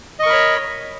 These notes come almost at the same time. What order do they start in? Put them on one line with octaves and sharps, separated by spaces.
D#5 C#6 A#4 B5 C#5